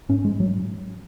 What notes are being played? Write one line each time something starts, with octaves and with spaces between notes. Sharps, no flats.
G#2 C#4
G#3
F#3